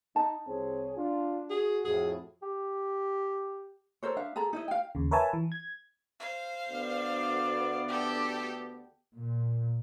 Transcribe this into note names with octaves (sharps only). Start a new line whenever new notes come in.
D#4 A5
C2 C4 G#4 C#5
D4 F4
F#4 G#4
F2 A2 G#4
G4
A4 A#4 C5 C#5
D4 E5 F5
G#4 A4 A#5 B5
D#4 E4 D#5
F5 G5
D#2 C#3
A#4 B4 C#5 E5 G#5 A5
E3
G#6
C5 F5
D2 B3 D5
G4 A4
A#2